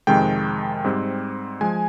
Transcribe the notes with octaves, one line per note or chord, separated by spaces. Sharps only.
F2 C3 D#3 G#3 G5
G#2 G3 C4
F3 G#3 G#5